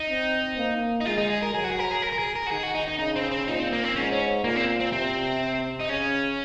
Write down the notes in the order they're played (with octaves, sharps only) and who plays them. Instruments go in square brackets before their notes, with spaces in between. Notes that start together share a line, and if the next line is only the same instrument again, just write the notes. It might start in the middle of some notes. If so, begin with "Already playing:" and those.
Already playing: [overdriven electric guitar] D#4
[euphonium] C4
A#3
[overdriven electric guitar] D#4
[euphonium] G#3 [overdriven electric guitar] F4
[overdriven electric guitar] D#4
G#4
A#4
[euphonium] F#3 [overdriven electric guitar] G#4
[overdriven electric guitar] F#4
G#4
A#4
G#4
A#4
A#4
G#4
A#4
F#4
[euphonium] D#3 [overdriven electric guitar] G#4
[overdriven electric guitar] F#4
D#4
D#4
[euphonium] C#3 [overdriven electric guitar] D#4
[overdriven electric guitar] C4
C4
[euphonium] A#2 [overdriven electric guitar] D#4
[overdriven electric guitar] C4
A#3
C4
[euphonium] G#2 [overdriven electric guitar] C#4
[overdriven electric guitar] C#4
[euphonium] A#2 [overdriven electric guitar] A#3
[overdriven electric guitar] C4
C4
[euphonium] C3 [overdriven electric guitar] C4
[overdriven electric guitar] D#4
[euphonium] C#3 [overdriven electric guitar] C#4